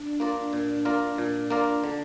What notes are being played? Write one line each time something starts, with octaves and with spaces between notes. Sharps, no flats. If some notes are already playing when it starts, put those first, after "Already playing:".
Already playing: D4
A#3 F4 A#4 D5
A#2 D4
A#3 F4 A#4 D5
A#2
A#3 F4 A#4 D5
D3